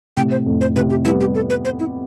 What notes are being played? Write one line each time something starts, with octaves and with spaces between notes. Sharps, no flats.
A2 C3 G5
C5
F2 A2
C5
A2 C3 B4
G4
G3 B3 E4
G4
A4
B4
C5
E4